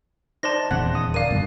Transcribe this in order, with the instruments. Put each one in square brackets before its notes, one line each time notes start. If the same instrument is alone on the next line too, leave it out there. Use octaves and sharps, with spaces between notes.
[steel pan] D#4 C5 D5 [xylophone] A5 C6 A#6
[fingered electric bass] D#1 E2 C#3 [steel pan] F#5
[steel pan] D#6
[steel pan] A#4 D5 [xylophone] F5 D#7
[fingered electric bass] G2 B2 D3